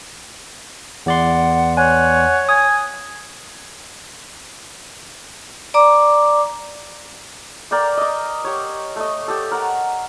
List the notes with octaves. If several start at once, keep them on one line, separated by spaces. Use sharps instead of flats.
E2 D5 F#5 C6
C#5 F#5 G#5
G#5 D#6
D5 A#5 D6
A#4 D5 G5 D6
D#5 D6
G4 C#5
A3 D#5
G4 A4
A#4 F#5